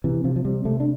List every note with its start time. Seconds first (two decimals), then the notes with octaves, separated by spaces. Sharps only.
0.04 C3 E3
0.24 C3 F3
0.36 F3
0.45 C3 G3
0.65 C3 A3
0.80 D4